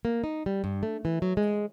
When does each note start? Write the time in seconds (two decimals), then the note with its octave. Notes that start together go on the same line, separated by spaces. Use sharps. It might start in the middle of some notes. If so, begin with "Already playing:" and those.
0.05 A#3
0.24 D#4
0.46 G3
0.64 G2
0.83 A3
1.05 E3
1.22 F#3
1.37 G#3